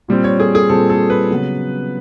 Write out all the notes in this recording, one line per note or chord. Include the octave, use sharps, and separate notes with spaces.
A#2 G3 C4
C#5
G#4
G#4
A#2 G3 C4 A4
A4
B4
C#3 F#3 B3